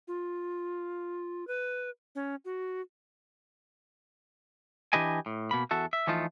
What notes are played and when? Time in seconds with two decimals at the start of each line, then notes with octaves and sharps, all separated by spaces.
0.08 F4
1.47 B4
2.15 C#4
2.45 F#4
4.93 E3 D4 G4 B4 D#5 G#5
5.26 A2
5.51 B2 A#3 B5
5.71 E2 F#4 A4 E5
5.93 E5
6.07 E3 F3 A3 D#4 F4